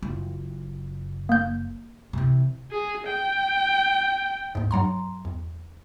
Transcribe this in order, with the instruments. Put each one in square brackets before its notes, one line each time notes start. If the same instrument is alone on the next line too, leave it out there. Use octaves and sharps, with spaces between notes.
[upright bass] F#1 F4
[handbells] A#3 G6
[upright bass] C3 E3
[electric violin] G#4
G5
[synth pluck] D#2 G#2
G2 F#3 A#5 C6
E2